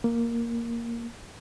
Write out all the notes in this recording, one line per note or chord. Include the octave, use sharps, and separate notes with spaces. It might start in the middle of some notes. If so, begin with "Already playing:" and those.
A#3